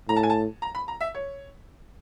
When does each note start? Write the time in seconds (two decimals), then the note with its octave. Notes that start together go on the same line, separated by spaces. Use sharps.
0.09 A2 A#5
0.16 A5
0.23 G#5
0.30 A5
0.62 A#5
0.75 B5
0.88 A#5
1.01 E5
1.14 C#5